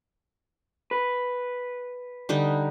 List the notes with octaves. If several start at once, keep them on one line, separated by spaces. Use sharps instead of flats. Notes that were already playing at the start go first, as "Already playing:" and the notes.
B4
D3 G3 D#4